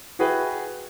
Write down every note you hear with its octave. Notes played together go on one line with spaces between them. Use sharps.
F#4 G#4 B4 E5 G5